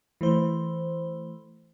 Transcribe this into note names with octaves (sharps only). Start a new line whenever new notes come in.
E3 A3 C5